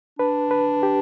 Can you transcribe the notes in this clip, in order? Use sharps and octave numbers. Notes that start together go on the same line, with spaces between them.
D4 B4
B4
G4